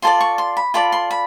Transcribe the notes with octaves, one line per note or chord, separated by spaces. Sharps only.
F4 A4 D5 C6
C#6
C6
B5
F4 A4 D5 B5
C6
B5